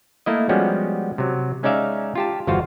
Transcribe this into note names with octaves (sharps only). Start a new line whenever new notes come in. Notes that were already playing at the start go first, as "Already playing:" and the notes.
A3 A#3 E4 D#5
F3 G3 G#3 B3 C#4 F#4
C3 F#3
G#3 C#4 D#4 D5 E5 F5
F4 G4 A5
G1 E2 F4 F#4 C5 F5